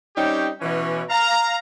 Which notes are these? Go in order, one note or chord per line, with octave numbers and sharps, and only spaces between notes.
G3 C4 C#4 D#4 G4 C#5
B2 E3 C#4
F5 A#5